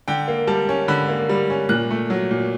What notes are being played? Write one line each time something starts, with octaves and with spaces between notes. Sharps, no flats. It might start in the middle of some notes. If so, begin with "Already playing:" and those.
D3 G5
A#3
G3 A5
C#4
D3 B5
A#3
G3
C#4
A#2 F#6
A3
F#3
A#2